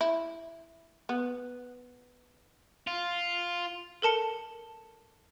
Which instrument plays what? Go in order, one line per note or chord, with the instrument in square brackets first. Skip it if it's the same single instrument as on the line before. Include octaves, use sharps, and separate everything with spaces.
[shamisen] E4
B3
[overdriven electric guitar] F4
[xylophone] A4 A#4 A5 C#7